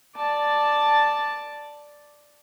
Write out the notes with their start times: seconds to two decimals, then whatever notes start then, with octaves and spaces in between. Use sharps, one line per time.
0.16 D5 A5